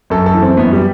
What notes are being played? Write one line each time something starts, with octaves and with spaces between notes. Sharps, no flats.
F#2 A4
A4
E3
C4
F#2 B3
G3